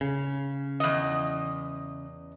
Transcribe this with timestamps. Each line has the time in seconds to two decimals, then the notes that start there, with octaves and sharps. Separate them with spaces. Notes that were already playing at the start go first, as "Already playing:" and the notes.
0.01 C#3
0.80 E2 D#5